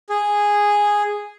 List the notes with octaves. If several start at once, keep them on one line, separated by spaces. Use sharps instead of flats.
G#4